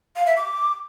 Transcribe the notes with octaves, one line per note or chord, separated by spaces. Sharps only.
F5
E5
D6